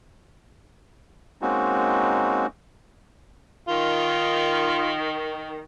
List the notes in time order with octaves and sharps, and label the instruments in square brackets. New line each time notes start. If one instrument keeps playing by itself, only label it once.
[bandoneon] G#3 A#3 C4 C#4 D#4 F#4
[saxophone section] D#3 [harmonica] F4